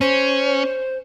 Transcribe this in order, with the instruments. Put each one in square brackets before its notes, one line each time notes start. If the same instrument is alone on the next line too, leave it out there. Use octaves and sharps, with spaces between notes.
[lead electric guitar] C#4 [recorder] C5